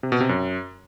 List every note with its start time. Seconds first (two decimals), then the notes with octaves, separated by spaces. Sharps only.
0.03 C3
0.12 B2
0.21 C3
0.29 F#2